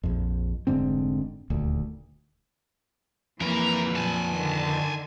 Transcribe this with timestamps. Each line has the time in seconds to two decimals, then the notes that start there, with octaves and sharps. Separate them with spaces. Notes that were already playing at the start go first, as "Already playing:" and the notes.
0.03 A#1 F2
0.67 F1 G#2 D3 C4
1.50 D#1 D2
3.41 F2 E3 A#3 A#4 B4
3.96 A#2 F#3 G#5 A5
4.34 D3 D#3